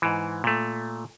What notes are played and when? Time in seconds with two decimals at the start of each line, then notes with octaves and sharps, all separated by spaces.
0.02 G#2 E3
0.44 A#2 A3